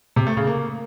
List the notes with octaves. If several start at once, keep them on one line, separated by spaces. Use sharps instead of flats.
C3
A3
C#3
A#3